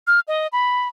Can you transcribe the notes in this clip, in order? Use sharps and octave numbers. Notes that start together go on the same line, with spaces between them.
F6
D#5
B5